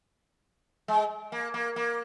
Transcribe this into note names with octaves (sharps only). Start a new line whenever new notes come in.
G#3
A#3
A#3
A#3